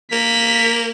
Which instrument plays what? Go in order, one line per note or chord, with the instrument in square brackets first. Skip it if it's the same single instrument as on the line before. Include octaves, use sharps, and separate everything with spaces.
[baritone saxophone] A#3 [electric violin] B6